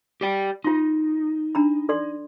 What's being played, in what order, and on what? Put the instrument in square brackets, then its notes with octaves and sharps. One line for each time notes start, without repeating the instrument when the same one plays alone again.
[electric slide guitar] G4 D5 G5
[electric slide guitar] D#4 [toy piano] F4 C6
[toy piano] D4 A#5 B5
A4 D5 C6